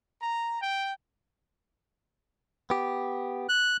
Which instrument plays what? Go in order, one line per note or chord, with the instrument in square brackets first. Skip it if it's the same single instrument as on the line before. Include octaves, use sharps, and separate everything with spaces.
[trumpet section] A#5
G5
[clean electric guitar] B3 G4
[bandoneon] F#6